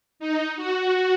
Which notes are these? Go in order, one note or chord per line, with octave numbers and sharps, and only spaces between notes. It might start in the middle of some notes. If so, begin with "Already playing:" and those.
D#4
F#4